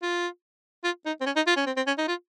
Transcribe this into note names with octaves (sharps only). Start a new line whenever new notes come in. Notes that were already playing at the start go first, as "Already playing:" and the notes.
F4
F4
D#4
C4
C#4
D#4
F4
C#4
C4
C4
C#4
D#4
F4